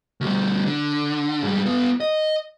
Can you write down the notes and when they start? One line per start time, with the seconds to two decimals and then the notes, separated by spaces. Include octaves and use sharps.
0.21 D2 G3
0.66 D3
1.43 G#2 G3
1.66 B3 F4
2.00 D#5